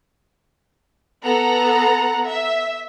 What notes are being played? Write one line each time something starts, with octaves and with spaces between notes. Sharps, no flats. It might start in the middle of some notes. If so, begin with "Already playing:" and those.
B3 A4 F#5 A#5
E5